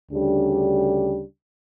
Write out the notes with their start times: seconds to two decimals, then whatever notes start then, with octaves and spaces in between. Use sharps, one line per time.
0.12 D2 C#3 G3 D4 G4